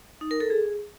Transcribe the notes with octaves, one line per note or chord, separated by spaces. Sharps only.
D#4
A#4
A4
G#4